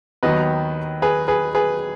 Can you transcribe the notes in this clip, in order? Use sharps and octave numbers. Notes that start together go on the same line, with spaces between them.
D#2 D#3 F#3 B3 B4 D#5
G#4 B4
G#4 B4
G#4 B4